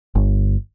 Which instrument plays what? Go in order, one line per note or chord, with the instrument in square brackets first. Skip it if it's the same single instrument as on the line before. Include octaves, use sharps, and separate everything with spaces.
[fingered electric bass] G1